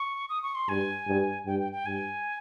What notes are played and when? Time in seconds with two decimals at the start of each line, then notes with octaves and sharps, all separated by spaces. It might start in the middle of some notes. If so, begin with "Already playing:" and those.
Already playing: C#6
0.29 D#6
0.43 C#6
0.55 C6
0.69 G2 G#5
1.07 G2
1.46 G2 G5
1.59 G5
1.72 G5
1.86 G2 G#5